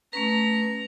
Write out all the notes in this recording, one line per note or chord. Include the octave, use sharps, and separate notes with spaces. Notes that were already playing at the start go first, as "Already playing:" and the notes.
A3 C#4 B4 A#5